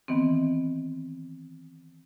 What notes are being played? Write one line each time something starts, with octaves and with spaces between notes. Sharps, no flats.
D#3 E3 B3 C4